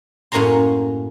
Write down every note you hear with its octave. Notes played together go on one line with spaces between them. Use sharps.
F#2 A2 A#3 C#4 A#5 C6